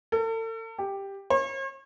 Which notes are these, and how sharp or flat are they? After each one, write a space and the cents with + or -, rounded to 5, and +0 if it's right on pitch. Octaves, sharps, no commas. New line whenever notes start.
A4 +40
G4 +5
C#5 -45